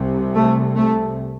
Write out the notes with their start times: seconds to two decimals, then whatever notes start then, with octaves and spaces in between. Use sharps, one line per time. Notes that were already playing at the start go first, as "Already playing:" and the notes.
Already playing: C2 C3
0.35 A3
0.76 A3